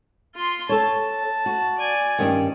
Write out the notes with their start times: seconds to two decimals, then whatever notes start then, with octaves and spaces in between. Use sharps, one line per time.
0.35 F4 C6
0.69 A4 C#5 A5
1.46 F#4
1.78 D5 G#5
2.19 G2 D#3 C#4